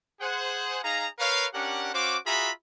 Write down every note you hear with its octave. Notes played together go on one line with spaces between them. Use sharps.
G#4 C5 F#5
D#4 G#4 F5 A#5
A#4 B4 C#5 F5
C#4 D4 G4 A#4 F#5
C#4 F#4 C5 F5 D6
F4 F#4 G#4 E5 A#5 B5